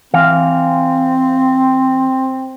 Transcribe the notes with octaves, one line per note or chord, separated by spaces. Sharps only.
E3 C4 F5